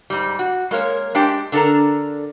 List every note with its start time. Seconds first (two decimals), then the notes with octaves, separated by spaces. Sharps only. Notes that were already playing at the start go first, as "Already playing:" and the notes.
0.10 G#2 G3
0.39 F#4
0.71 G#3 A#3 A#4 C#5
1.15 G#3 D4 G4 G5
1.52 D3 D4 A4 A#4 A#5